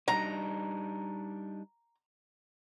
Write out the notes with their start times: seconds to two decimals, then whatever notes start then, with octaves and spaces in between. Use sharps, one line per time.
0.08 G3 D4 D#4 A#5